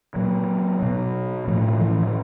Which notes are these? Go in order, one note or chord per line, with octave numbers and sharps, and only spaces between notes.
A#2 F#3
B2
A2 F3
E3
E3